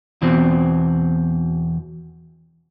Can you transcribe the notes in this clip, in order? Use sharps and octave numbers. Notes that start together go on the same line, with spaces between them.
E2 B2 E3 C4